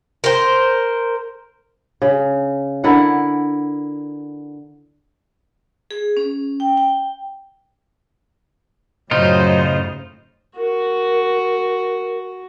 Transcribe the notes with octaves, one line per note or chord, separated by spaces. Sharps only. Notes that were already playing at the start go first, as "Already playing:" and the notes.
A#4 C5
C#3
D3 E4 A#4 F#5
G#4
C#4
G5
G5
F#2 A2 C#3 F#3 D#4 F4 C5 D#5
F#4 A#4